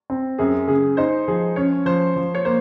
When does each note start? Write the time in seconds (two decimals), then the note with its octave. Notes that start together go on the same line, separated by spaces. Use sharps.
0.10 C4
0.38 F#2 G#4
0.68 C#3 G#4
0.97 D#4 C5
1.28 F3 G#4
1.56 C#4 C#5
1.86 F3 C5
2.16 F3
2.35 C#5
2.45 A#3 C5